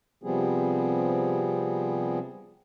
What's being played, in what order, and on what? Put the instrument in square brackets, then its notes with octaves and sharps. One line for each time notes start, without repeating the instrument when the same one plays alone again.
[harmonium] C3 F3 G3 B3 C4 G#4